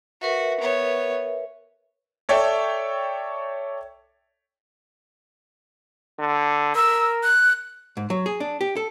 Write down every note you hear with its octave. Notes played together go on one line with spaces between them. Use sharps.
F#4 A#4 B4 E5
B3 C#5
A4 C#5 D5 E5 G5
D3
A#4 E6
F#6
G#2
F#3
G#4
D4
G4
A4